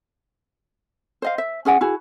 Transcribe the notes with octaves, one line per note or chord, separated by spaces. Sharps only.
C5 D#5 F5
E5
C#4 G#4 F#5 G#5
E4 F#4 G#4